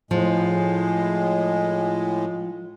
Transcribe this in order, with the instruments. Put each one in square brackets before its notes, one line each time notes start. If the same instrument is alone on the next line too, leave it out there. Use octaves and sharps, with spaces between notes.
[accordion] A2 G#3 [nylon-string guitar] F3